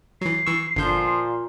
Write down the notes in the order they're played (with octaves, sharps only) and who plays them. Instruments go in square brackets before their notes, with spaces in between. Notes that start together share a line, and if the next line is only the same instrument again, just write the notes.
[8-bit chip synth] E3 F#3 [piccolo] C7
[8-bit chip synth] E3 C#6 E6
[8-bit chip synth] G1 D3 G6 [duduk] A#2 [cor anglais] F3